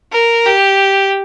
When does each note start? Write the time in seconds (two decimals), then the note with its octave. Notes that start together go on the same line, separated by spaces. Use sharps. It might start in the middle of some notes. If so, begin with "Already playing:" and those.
0.12 A#4
0.46 G4